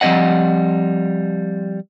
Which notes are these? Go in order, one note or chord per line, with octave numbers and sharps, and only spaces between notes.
F3 G3 C4 C#5 D#5 F#5